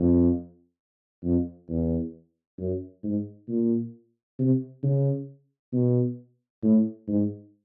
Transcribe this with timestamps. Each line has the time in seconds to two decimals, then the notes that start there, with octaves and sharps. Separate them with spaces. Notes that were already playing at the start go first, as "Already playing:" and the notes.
Already playing: F2
1.24 F2
1.69 E2
2.59 F#2
3.03 G#2
3.48 A#2
4.39 C3
4.83 C#3
5.73 B2
6.63 A2
7.08 G#2